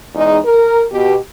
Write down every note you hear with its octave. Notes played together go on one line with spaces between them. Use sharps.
E2 G#3 D#4
A#4
B2 G4